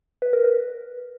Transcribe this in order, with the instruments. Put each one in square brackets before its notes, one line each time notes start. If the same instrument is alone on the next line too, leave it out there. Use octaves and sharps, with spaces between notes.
[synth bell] B4
A#4
B4